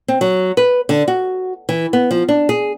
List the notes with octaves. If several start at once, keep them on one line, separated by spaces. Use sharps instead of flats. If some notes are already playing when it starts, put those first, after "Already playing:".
C4
F#3
B4
D3
F#4
E3
B3
F3
D4
G#4